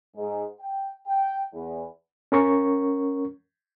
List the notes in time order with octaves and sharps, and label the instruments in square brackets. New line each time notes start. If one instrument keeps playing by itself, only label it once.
[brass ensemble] G#2
G5
G5
E2
[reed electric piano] C#4 A#4 C#6